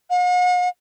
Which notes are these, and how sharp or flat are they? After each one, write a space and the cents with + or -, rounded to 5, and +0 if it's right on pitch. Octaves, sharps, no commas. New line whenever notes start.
F#5 -45